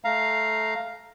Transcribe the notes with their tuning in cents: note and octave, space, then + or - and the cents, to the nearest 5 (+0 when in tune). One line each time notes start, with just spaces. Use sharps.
A3 -10 F5 +0 A#5 +0